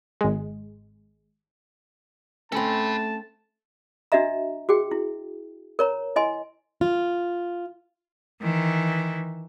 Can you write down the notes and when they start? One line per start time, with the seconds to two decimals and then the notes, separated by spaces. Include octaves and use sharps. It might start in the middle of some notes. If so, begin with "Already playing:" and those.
0.21 G#1 G#3
2.52 A3 C4 C#4 A4 A5 B5
4.12 D4 F#4 D#5 E5 A#5
4.69 F#4 G#4 G5
4.91 E4
5.79 A#4 C#5 A#5
6.16 E4 D#5 G#5 C6
6.81 F4
8.41 D#3 E3